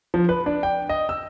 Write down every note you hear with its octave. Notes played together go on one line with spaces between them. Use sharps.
F3
B4
D4
G5
D#5
E6